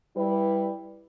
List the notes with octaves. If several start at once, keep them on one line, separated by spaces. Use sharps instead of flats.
G3 E4 B4